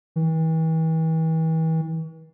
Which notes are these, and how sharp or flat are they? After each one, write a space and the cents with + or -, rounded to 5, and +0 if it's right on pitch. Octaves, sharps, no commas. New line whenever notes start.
E3 -40